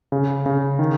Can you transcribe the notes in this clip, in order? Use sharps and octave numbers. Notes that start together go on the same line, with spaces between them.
C#3
C#3
D#3